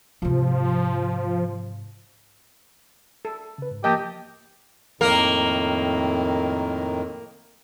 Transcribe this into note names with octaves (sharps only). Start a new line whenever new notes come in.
G#2 C3 F3
A4
C#3 B4
G#2
F3 A#3 G4 A#4 D#5 G5 A5
F2 A2 D#3 A#3 A#4